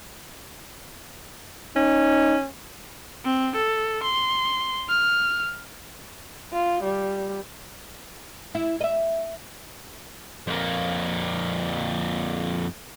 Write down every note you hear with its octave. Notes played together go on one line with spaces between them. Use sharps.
C#4 D#4
C4
A4
C6
F6
F4
G3
E4
D#5 E5
F2 A#3